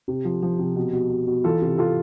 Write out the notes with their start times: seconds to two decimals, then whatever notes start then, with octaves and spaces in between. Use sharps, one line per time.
0.08 C3
0.25 F3
0.43 F3
0.59 C3
0.76 B2
0.93 B2
1.10 B2
1.27 B2
1.44 E3 F4 A4
1.62 C3
1.78 C3 F4 A4